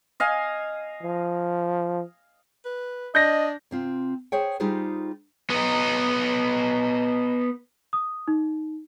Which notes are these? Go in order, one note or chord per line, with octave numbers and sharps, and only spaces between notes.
D#5 F5 G#5
F3
B4
D4 D#5 G6 A#6
C3 C4 F4
G#4 C5 C#5 E5 G5
G3 D#4 F4 G4 G#4 C5
B3 D#4
D#6
D#4